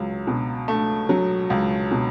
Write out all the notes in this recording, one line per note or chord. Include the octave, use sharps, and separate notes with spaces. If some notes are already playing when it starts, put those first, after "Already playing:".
Already playing: C#2 F#3
B2
A3
F#3
C#2
B2